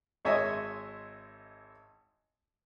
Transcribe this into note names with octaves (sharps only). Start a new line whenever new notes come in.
G#1 G#3 C#5 D#5 E5 G#5